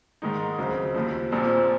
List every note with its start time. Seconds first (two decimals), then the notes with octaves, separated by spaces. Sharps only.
0.22 G#2 D#3 G#3 D#4
0.58 C#2 C#3 F#3 C4
0.94 D#2 C#3 F3
1.32 A#1 A#2 F3 C4